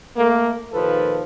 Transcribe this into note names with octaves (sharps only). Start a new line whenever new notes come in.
A3 A#3
D#2 A#2 F3 A4 B4